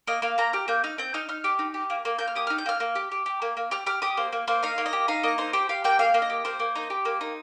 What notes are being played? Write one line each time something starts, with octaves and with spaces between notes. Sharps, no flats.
A#3 D#5
A#3 F5
A#3 A#5
G4 F6
A#3 G6
D#4 F6
C4 G6
D#4 F6
D#4 F6
G4
D#4
G4
A#3
A#3
A#3 G6
F6
G4 D#6
D#4 F6
G6
A#3 F6
A#3
G4
G4
G4
A#3
A#3
G4 F6
G4 F6
G4 D#6
A#3 C5
A#3
A#3 C5
D#4 F5
A#3
D#5
G4
D#4 F5
A#3 D#5
D#4 C5
G4 C5
G4 F5
A#3 G5
A#3 F5
A#3
D#5
G4
A#3 C5
A#3
D#4
G4
A#3
D#4